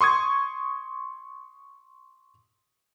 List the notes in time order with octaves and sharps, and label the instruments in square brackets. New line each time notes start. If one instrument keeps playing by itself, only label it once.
[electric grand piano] C6 C#6 D#6 G#6